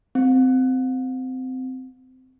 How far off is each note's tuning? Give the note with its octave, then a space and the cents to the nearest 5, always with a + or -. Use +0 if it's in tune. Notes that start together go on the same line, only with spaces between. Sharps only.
C4 -20